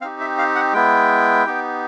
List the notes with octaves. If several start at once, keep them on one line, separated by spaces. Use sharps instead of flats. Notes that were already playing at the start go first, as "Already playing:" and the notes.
C4 D#4 G4 F5
E5
F5
F#5
G#3 B3 E4 G5
B3 D#4 G4